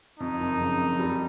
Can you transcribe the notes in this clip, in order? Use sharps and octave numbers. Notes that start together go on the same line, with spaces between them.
F2 D#4
F#1
C#3
F2
G3